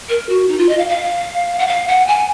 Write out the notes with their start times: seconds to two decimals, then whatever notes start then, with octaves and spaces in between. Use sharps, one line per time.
0.09 A#4
0.29 F#4
0.48 D#4
0.58 F4
0.69 D#5
0.78 F5
0.89 F5
1.59 F#5
1.67 F5
1.88 F#5
2.07 G#5